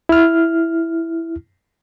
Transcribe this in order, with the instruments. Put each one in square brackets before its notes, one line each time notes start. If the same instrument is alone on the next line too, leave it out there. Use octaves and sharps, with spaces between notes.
[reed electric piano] E4 F6